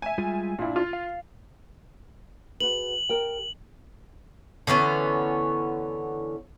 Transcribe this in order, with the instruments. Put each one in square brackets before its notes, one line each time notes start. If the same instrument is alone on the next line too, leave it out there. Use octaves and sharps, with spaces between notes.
[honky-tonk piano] E5 G#5
[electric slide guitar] G3 G#3 F4
[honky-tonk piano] A#2 E4 [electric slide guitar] D4
[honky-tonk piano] F4
[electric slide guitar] F5
[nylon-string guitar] F#4 G#4 B4 [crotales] F#7
[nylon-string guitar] G4 A#4 G5
[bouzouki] D3 E3 B3 C#4